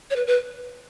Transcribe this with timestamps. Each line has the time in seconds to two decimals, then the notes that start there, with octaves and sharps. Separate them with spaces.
0.10 C#5
0.16 B4
0.27 B4